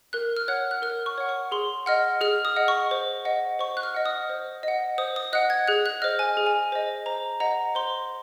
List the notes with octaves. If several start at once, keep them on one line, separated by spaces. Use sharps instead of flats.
A#4 F#6
F6
C#5 F#5 F#6
F#6
A#4 F6
C#6
C#5 F#5
C#6
G#4 C6
D#5 F#5 F6
G#4 F6
D#6
D#5 F#5
C#6
C5
D#5 F#5
C5 C#6
F#6
F6
D#5 F#5
D#6
C5
D#5 F#5
C5 D#6
D#6
D#5 F#5 F#6
G#6
G#4 F#6
F#6
C5 D#5 F6
G#5
G#4
G#5
C5 D#5
C5 A#5
D#5 F#5 A#5
C5 C6